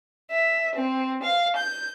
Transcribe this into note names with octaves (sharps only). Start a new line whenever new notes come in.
E5
C4
F5
G6